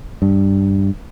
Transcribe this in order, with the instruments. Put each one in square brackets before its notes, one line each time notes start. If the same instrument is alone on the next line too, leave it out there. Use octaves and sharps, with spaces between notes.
[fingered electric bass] G2